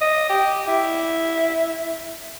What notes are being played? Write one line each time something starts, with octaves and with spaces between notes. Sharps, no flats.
D#5
G4
E4